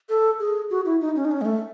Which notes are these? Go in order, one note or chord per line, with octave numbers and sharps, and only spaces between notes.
A4
G#4
F#4
E4
D#4
C#4
D#4
C#4
G#3
A3